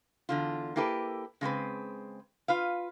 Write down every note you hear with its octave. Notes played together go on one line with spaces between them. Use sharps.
E2 D3 F4
A#3 E4 G4 A4 B4
C#3 G#3 C4 B4
F4 B4 F5